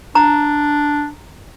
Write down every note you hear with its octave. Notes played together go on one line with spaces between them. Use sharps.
D4 A#5